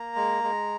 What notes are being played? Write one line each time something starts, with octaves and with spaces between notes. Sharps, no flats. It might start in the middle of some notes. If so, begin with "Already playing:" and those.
Already playing: A#3 A#5
G#3
G#3